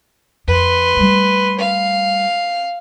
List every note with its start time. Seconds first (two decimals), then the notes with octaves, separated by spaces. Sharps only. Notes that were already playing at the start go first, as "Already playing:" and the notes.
0.47 F2 B4 C6
0.97 G3 A3
1.59 F5